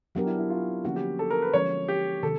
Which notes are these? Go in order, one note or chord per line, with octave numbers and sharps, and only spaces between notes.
F#3 B3 D4 F#4 G4 A#4
E4
E4
F4
D3 F3 A#3 C#4 E4 F#4
G4
A4
A#4
B4
D3 F3 G#3 C#4 F#4 C#5
G4
C3 D#3 A4